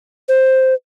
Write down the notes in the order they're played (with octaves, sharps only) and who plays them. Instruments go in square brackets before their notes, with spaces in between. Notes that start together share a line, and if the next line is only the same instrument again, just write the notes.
[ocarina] C5